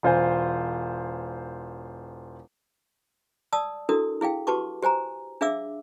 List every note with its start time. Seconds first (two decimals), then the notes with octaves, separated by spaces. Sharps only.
0.03 E1 F4 C5 G#5
3.53 D5 A5 D#6 E6
3.89 D4 E4 F#4 A4 A#4 D#6
4.21 E4 G#4 F5 G5
4.47 F#4 G4 B4 A5 C#6 D6
4.83 G4 C5 G#5 A#5
5.41 D4 G#4 E5 F5 D6 E6